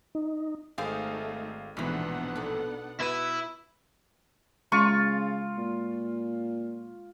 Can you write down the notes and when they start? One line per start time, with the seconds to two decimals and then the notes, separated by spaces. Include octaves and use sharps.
0.15 D#4
0.78 G#1 A3 D#4 G#4 A#4 C5 F5
1.77 A#1 G#2 B2 E3 B3 D4 F#5
2.36 D#4 A4
3.00 B2 E4 B4 D#7
4.72 C#3 G#3 F4 C#6
5.57 A#2